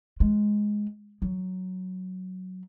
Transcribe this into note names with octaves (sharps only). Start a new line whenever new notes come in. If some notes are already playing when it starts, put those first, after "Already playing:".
G#3
F#3